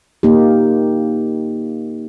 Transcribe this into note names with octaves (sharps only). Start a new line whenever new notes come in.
A#3 D#4 G4